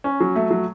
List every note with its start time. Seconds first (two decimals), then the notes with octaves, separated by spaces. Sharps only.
0.04 C#4
0.20 F#3
0.36 A3
0.51 F#3